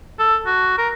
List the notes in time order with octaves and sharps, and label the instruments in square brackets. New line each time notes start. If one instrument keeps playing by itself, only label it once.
[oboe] A4
F#4
A#4